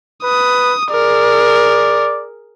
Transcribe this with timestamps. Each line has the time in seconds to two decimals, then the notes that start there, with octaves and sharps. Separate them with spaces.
0.24 B4 D#6
0.91 G#4 A#4 D5